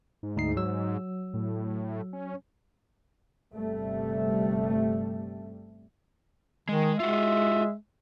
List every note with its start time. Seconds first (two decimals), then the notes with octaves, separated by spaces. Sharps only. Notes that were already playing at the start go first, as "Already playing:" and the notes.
0.23 G#2
0.36 D2 D#4 C7
0.57 F#3 E6
1.34 A2
2.13 C#4
3.53 G1 C3 G3 A3
6.69 D#3 G#3
7.00 G#3 F4 F#4 E5